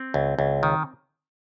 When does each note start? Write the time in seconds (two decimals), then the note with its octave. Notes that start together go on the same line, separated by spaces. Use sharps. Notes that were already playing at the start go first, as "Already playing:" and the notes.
Already playing: C4
0.14 C#2
0.39 C#2
0.63 D#3